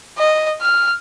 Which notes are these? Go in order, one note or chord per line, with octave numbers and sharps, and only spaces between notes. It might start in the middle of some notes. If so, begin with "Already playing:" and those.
D#5
F6